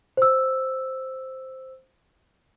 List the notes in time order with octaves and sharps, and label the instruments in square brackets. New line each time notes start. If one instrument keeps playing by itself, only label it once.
[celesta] C5 E6